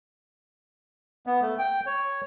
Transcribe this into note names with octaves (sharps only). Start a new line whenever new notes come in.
B3
A3
G5
C#5